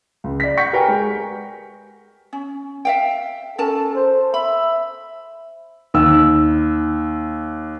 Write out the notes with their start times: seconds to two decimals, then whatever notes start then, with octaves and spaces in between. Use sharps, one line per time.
0.24 C#2
0.40 D5 B6
0.57 F#5 C#6 G6 B6 C#7
0.73 G4 A#4 B4 G5 G#5
0.88 G#3
2.33 C#4
2.85 E5 F5 G5
3.58 C#4 A4 A#4 A5
3.95 C5
4.34 E5 B5
5.94 D#2 E6